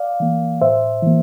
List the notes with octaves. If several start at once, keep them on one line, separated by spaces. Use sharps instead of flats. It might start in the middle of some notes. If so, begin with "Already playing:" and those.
Already playing: D5 F5
E3 A#3
A2 C5 E5
E3 A#3